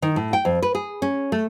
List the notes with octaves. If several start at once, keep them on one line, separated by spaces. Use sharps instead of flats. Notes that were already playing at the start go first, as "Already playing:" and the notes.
D#3
A2
G5
F2
B4
G#4
C#4
A3